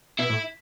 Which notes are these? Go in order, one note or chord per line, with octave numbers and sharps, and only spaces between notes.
B2 E4
A2